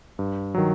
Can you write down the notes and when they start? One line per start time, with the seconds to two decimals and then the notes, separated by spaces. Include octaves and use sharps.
0.19 G2
0.54 D#3 F#3